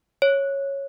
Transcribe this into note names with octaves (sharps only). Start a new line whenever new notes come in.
C#5